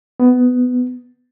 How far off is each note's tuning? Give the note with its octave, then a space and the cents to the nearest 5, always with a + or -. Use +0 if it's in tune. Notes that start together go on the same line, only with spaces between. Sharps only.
B3 +15